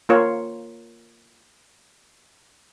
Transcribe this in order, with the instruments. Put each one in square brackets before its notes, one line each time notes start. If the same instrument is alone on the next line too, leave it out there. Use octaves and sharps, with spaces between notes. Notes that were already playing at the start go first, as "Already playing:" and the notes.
[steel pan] A#3 F4 A#4 C#5